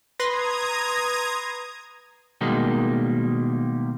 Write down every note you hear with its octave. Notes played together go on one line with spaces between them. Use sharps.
B4 A#5 C6 D#6 G#6 A#6
B2 D#3 G3 G#3 A#3